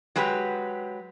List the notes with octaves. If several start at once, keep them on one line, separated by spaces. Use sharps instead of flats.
F#3 G#3 G4 B4